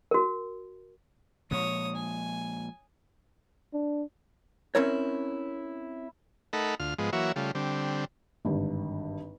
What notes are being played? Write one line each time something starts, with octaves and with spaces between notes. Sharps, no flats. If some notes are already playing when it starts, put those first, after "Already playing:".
F#4 A#4
A#2 F3 G#3 C#5 D#6
G#5
D4
C4 C#4 E4 A#4 C#5
A3 D#4 A4 A#4 F#5 B5
D2 F4 F6
G#2 F3 G#3 B3
E3 F#3 A#3 F#4 C#5 E5
C#3 G3 A3 F4
D3 G3 C4
G#1 G2 D3